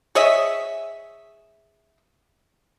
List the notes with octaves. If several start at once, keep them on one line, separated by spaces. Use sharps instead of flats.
G#4 C#5 D#5 E5